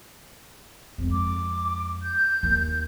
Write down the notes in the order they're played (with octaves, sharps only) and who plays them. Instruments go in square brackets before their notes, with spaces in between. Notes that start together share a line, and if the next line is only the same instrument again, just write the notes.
[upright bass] F2 G#3
[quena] D6
G6
[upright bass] D#2